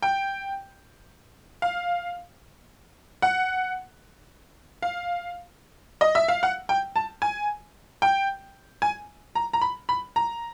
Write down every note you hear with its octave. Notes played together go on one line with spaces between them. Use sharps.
G5
F5
F#5
F5
D#5
E5
F5
F#5
G5
A5
G#5
G5
G#5
A#5
A#5
B5
B5
A#5